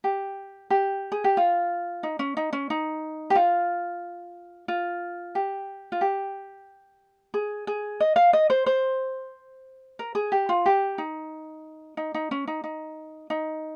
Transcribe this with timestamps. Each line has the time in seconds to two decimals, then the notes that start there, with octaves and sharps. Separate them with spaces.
0.04 G4
0.70 G4
1.12 G#4
1.24 G4
1.37 F4
2.03 D#4
2.19 C#4
2.37 D#4
2.53 C#4
2.70 D#4
3.30 G4
3.35 F4
4.68 F4
5.35 G4
5.92 F4
6.01 G4
7.34 G#4
7.67 G#4
8.00 D#5
8.16 F5
8.33 D#5
8.50 C5
8.66 C5
9.99 A#4
10.15 G#4
10.32 G4
10.49 F4
10.66 G4
10.98 D#4
11.97 D#4
12.14 D#4
12.31 C#4
12.47 D#4
12.64 D#4
13.30 D#4